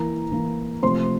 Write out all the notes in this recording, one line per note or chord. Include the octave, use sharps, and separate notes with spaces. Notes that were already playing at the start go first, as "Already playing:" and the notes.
Already playing: E3 A#3 E4 A#4 A#5
E3 A#3 E4
C3 F3 A3 C4 C5 C6